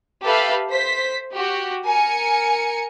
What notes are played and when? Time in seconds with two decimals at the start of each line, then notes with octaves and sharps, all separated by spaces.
0.24 G4 A4 B4 E5 F5
0.70 C5 B6
1.32 F#4 G4
1.85 A#4 G#5 C#7